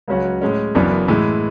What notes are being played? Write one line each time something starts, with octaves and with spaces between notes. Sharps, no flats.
C#2 C#3 F#3 C#4 F#4
A2 G#3 C#4
F#1 F#2 E3 B3 D4
A2 E3 G#3